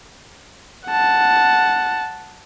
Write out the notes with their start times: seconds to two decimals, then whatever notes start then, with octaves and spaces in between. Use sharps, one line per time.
0.87 F#5 A5